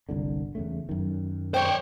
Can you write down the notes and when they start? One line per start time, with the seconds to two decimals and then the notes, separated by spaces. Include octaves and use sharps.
0.09 G1 C2 D3
0.55 E2 C#3 A3
0.89 F#2 D#3
1.54 C5 C#5 G5